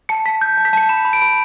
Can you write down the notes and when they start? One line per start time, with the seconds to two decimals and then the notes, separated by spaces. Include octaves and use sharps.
0.09 A5 C#7
0.26 A5 B6
0.41 G6
0.57 A5
0.65 B6
0.73 A5 C#7
0.89 B5 E7
1.05 B5
1.13 D7
1.22 B5